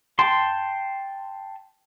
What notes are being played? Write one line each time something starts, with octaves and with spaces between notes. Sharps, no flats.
G5 A5 C6